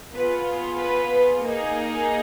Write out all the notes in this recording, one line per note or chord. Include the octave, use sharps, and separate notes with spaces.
B3 F4 G#4 B4
B4
A#3 D#4 G#4